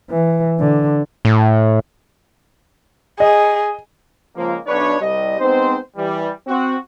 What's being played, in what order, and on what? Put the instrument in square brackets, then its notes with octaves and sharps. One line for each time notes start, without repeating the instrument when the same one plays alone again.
[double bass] E3
D3
[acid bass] A2
[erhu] G#4 [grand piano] D#5
[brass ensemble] C#2 F3 A#3
B1 D4 B4 C#5
C2 G3 D#5
G#3 B3 C4 D#4 C5
E3 G3
C4 F#4